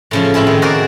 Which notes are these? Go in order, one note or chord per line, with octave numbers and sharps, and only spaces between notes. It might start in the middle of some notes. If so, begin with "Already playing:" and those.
A2 C#3 F3
A2 C4 E4 G#4
D#3
F#4 G#4 A#4 C5 D5